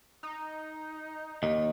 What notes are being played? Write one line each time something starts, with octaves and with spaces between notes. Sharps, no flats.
D#4
D#2 D#5